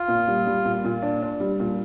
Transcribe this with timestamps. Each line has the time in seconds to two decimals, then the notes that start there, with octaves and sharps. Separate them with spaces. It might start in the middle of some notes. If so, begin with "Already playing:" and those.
Already playing: F4
0.08 A#2
0.28 G3
0.46 G3
0.65 A#2
0.84 A#2
1.02 D4
1.22 D4
1.40 G3
1.60 A#2